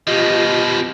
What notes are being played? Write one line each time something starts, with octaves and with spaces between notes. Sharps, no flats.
B2 F3 F4 G4 D#5